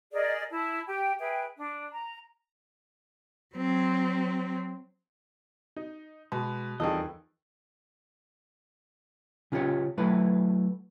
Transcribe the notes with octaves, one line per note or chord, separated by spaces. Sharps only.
G#4 A#4 D5 D#5
E4 A5
G4 G5
G#4 B4 E5 G5
D4
A#5
F#3 C4
D#4
B2 G#3 B4
E2 D#3 G3 C4 F4 G#4 A4 D#5
C#3 C#4 F4 G4 B4 C#5
F#3 A3 E4 B4